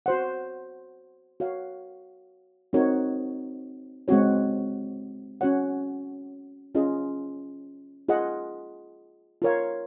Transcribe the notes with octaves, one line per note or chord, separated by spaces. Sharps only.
F#4 C5 F#5
F#4 C#5 F5
C4 D#4 F#4 A#4 C#5
G#3 C4 F#4 C#5
C#4 F#4 C#5 F#5
C#4 F4 G#4 D#5
F4 G#4 D#5 F#5
F4 A#4 C#5 F5